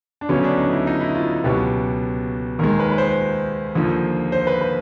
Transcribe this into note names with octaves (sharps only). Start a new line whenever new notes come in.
D4
D2 C#3 F#3 B3 C#4
D4
D#4
E4
D#4
E4
F4
C#2 B2 F#3 B3 G4
D#2 D#3 G#3 A#4
B4
B4
C5
D#2 D3 F3 A#3
C5
B4
B4